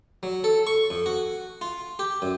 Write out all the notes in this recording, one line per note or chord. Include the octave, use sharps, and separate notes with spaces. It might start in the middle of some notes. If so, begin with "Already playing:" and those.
F#3
A4
C#6
F2
F#4
F4
G4
F#2